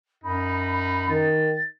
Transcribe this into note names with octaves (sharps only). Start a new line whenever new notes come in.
F#2 D#4 B5
D#3 A6